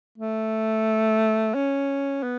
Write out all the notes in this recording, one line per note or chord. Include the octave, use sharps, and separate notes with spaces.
A3
C#4
B3